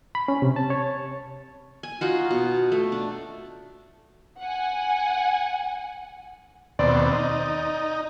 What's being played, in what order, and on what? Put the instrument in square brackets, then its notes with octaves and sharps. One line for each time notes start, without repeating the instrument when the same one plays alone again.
[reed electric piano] B5
C#4
C3
A5
C#5
[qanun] G#5
D#4 F4 F#4
B2
A3
D4
[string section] F#5 G#5
[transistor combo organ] D#2 B2 C4 [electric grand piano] D5
[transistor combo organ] D#4